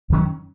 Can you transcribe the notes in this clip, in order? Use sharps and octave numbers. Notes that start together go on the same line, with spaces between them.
F#2 D#3 F#3 C#4